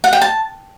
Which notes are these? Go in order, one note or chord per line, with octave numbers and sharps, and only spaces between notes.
F#5
G5
A5